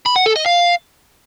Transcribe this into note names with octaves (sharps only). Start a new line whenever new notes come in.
B5
F#5
A4
D#5
F5